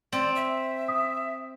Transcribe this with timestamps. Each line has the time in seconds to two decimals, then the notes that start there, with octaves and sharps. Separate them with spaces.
0.12 C4 D5
0.36 E5
0.88 D#6